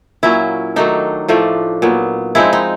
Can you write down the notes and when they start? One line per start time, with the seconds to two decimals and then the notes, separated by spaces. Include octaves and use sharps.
0.23 A#2 F#3 A#3 C#4 E4
0.76 D#3 F#3 A3 D4 D#4
1.28 A2 F3 A3 D4
1.82 A#2 F#3 B3
2.35 F3 G#3 C4 D#4 E4
2.53 D#4